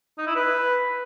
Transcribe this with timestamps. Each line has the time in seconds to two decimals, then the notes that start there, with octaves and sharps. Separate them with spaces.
0.18 D#4
0.27 E4
0.35 B4